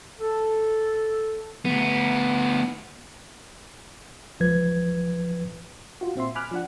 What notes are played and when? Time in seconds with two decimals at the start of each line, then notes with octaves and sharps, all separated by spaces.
0.20 A4
1.65 D2 B3
4.40 C#2 F3 B4 G#6
6.01 F4 F#4
6.16 A#2 C4 E5 C6
6.35 G#5 B5 D6 F6 F#6
6.51 F3 D4 F#5